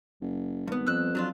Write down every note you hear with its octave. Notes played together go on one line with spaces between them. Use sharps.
F#1
G#1 G2 B3
F2 E6 F#6
F#3 D4 F4